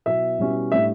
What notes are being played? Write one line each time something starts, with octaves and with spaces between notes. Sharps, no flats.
B2 F#3 B3 E4 E5
B2 G3 C#4 E4
A2 G3 D4 E5